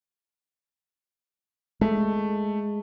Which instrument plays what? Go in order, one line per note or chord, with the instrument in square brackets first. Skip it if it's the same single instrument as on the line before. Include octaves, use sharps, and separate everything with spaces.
[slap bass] G#3 [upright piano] A3